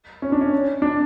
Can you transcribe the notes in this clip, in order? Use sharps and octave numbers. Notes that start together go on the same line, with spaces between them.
C#4
D4
C#4
D4